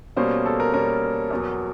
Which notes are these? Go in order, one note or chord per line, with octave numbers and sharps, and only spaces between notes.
B2 G3 A#3 C#4 C5
A4
A#4
B2 G3 A#3 C#4 A#4
E2 B2 F#3